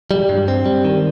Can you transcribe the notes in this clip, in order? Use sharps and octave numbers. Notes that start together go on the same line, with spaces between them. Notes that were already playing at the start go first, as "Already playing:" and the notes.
G3
G2
C4
G3
D#3